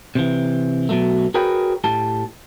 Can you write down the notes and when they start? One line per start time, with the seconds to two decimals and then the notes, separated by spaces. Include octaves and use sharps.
0.15 C3 E3
0.89 B2 F#3 A3
1.34 F#4 G#4 A#4 B4 C#5 G5
1.84 A2 G4 A5